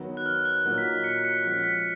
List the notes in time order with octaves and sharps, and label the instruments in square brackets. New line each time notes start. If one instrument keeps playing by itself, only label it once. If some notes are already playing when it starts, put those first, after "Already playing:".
Already playing: [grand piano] D#3 F#3 B3
[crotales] F#6
F6
F#6
[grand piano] A#2 F#3 A#3 D#4 F#4
[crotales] B6
B6
C#7
C#7
[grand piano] F3 G#3 C#4 F#4 [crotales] B6
[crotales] B6